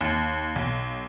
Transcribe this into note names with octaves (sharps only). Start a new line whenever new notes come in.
D#2
B1